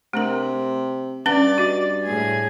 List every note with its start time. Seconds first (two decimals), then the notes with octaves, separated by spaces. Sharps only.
0.13 C3 A3 D4 A#4
1.26 G2 C#4 B4 D5 F#5 A6
1.58 F#4 D#5
2.04 A2 G#4 G#6